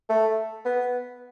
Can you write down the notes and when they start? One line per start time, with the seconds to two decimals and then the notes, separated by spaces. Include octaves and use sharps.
0.09 A3
0.65 B3